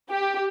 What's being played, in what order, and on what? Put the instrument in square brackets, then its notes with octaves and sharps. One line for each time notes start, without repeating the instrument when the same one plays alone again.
[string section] G4